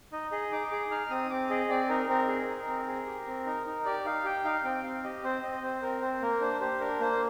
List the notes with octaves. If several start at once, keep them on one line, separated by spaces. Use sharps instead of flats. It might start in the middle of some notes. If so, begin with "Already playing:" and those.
D#4 D#5
G#4 D#5
D#4 D6
G#4 D6
D#4 F6
C4 D#6
C4 D6
G#4 D#5
C4 D5
D#4 A#4
C4 A#4
G#4
D#4
C4
G#4
G4
C4
D#4
D#4
G4 D5
D#4 F5
G4 G5
D#4 F5
C4 G5
C4 F5
G4 D#5
C4 C5
C4 D#5
C4 C5
C4 A#4
C4 C5
A#3 A#4
D4 C5
G4 C5
D4 A#4
A#3 C5